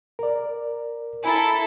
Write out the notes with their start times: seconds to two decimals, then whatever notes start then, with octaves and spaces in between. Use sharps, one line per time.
0.19 A#4 D5
1.24 E4 A4 G#5 A#5